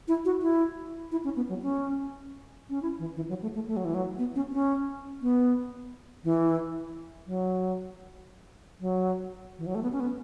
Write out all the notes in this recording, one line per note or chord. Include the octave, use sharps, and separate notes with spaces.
E4
F#4
E4
E4
C#4
B3
F#3
C#4
C#4
E4
E3
E3
F#3
A3
A3
A3
F#3
E3
F#3
B3
C#4
C#4
B3
E3
F#3
F#3
E3
F#3
A3
B3
C#4
B3